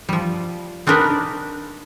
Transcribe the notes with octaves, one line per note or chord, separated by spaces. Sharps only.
F3 G3
C4 D4 D#4 A#4 B4